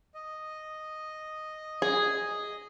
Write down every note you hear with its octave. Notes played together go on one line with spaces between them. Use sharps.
D#5
G#4